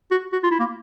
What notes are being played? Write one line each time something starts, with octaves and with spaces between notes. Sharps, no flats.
F#4
F#4
F4
E4
A#3